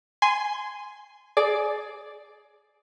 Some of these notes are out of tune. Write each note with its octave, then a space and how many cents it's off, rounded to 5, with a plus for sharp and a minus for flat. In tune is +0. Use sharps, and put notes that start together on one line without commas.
G#5 +0 C6 -20
G#4 +20 D5 +0